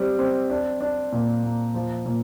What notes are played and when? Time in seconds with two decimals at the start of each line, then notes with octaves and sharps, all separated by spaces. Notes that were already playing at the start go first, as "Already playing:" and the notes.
Already playing: G3 C4
0.19 C4
0.50 D4
0.80 D4
1.12 A#2
1.43 A#3
1.74 F3
2.06 A#2